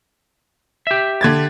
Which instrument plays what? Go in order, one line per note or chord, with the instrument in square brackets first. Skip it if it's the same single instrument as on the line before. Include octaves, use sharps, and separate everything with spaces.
[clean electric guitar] G4 E5
[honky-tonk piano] D3 G#6 A6